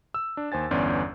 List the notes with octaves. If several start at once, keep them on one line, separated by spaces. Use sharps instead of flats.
E6
D4
D#2 C5 G#5 A6
G1 E2 C#4 D5 C6